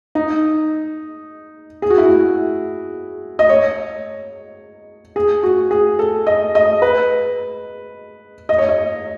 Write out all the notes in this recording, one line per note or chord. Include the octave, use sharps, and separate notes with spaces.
D#4
G#4
F#4
E4
F#4
D#5
C#5
G#4
F#4
G#4
A4
D#5
D#5
B4
D#5
C#5
D#5